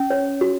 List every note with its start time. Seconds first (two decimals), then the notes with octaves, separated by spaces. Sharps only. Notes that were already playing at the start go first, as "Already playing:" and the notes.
Already playing: C#4
0.10 C#5
0.41 F#4